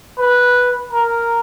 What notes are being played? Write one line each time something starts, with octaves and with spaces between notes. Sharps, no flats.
B4
A#4